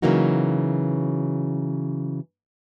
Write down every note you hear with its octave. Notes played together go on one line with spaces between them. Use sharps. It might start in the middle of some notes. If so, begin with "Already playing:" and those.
C#3 E3 F#3 A#3 D#4 F#4